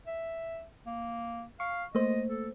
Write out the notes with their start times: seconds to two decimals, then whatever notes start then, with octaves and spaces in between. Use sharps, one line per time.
0.07 E5
0.86 A#3
1.60 F5 C#6
1.95 A3 A#3 C5 D#5
2.29 A4